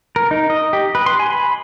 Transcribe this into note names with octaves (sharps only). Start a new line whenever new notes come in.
A#4
D#4
D#5
G4
B4
C6
G#5
B5